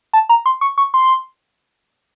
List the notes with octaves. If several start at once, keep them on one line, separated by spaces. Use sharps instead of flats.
A5
A#5
C6
C#6
C#6
C6